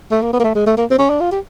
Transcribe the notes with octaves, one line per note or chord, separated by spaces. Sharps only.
A3
A#3
B3
A#3
A3
G#3
A3
A#3
C4
C#4
D4
F4
G4